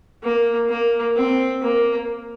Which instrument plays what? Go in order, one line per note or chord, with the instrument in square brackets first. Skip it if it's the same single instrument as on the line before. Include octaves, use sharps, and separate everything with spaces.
[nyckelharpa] A#3
A#3
C4
A#3